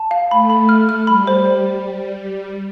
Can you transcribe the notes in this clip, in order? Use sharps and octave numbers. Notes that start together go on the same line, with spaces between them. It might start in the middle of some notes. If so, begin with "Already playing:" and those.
Already playing: A5
F5
A3 B5
B5
F6
F6
G3 B5
C5